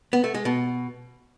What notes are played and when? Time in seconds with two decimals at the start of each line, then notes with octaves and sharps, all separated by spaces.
0.13 B3
0.24 A3
0.34 G#3
0.45 B2